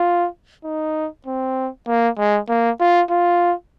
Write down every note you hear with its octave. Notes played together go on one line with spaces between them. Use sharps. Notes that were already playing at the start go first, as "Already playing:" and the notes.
Already playing: F4
D#4
C4
A#3
G#3
A#3
F4
F4